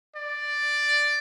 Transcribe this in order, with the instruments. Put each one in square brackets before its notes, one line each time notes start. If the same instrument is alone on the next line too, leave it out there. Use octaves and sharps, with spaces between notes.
[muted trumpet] D5